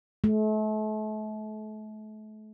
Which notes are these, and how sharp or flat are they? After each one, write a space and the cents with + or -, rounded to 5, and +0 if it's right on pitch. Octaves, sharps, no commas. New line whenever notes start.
A3 -35